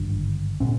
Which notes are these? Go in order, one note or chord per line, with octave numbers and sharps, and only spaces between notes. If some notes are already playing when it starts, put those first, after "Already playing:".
Already playing: G#1 G2 D3
A#2 C#4